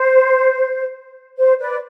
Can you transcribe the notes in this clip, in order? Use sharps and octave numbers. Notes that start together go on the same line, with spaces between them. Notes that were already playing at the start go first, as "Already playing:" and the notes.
Already playing: C5
C5
B4 D5